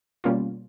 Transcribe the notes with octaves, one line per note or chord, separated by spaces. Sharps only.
B2 G3 A#3 C#4 F4